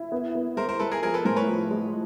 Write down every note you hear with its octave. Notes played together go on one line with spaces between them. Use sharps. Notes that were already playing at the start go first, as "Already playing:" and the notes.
Already playing: E4
B3
B3
G#3 A#4 C5
A#4 C5
G#3 A4 B4
G#4 A#4
F3 G#4 A#4
A4 B4
A2 A#4 C5
B4 C#5
F3
G#3